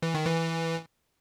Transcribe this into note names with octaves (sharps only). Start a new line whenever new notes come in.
E3
D#3
E3